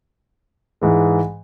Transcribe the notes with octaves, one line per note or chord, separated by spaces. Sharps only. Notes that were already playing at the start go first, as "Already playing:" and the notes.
G#2 E3 G#3